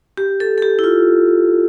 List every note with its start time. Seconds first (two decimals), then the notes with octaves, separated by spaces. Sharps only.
0.17 G4
0.40 A4
0.58 A4
0.62 G4
0.79 E4
0.84 F4